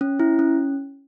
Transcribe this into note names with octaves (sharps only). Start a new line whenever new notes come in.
C#4
E4
C#4